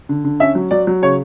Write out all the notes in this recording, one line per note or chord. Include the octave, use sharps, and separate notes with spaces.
D3
D3
C#4 E5
F#3
F#3 D5
F#3
C#3 C#5